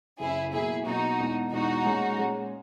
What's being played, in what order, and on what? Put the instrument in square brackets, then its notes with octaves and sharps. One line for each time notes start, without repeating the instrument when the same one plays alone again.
[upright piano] F#1 F#2 C#3 [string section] E4 G#4
[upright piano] B2 F#3 A#3 [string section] E4 G#4
[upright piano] B2 F#3 A#3 [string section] D#4 F#4
[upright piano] E1 E2 B2
[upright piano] E1 E2 B2 [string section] D#4 F#4
[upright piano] A#2 G#3 C#4 G#4
A#2 G#3 C#4 G#4